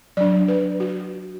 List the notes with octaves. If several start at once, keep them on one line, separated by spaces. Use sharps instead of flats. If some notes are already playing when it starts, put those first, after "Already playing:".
F#3 D4 D5
B4
F#4